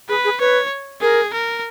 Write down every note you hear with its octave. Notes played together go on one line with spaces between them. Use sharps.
G#4 B4
G#4
B4 C#5
G#4 A#4
A#4